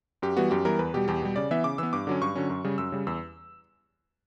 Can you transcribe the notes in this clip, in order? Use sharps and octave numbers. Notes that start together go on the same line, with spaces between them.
F#2 G4
E3 G3 B3 F#4
F#2 G4
E3 G3 B3 A#4
E2 B4
B2 G3 G4
E2 G4
B2 G3
C#3 D5
E3 B3 E5
C#3 D6
E3 B3 E6
G2 D6
D3 F#3 C#4
G2 C#6
D3 F#3 C#4
F#2
C#3 G3
F#2 E6
C#3 G3
E2 E6